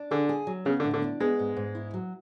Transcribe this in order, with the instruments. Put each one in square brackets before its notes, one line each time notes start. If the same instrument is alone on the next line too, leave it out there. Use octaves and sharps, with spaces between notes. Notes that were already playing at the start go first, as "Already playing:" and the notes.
Already playing: [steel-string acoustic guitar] D4
[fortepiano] D3 [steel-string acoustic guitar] G#4
[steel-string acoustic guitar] G#4
F#3
[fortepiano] C#3 [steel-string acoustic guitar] B3
[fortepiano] D3
[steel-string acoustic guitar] A2
[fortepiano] D3
[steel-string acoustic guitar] D4
[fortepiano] G#3 [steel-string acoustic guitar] B3
[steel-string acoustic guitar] G#2
G#2
E4
F#3